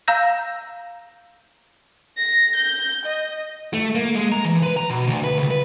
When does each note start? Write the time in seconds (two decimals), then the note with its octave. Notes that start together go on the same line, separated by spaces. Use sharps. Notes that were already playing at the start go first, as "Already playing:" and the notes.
0.08 F5 A#5 E6 G6 A#6
2.18 A#6
2.56 G6
3.05 D#5
3.73 A3
3.95 A#3
4.15 G#3
4.32 A#5
4.45 E3
4.63 B4
4.77 A#5
4.90 B2
5.07 D2
5.24 B4
5.38 C#2
5.51 B4